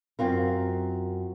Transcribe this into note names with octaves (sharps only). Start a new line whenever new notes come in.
F#2 C4 F4 A#4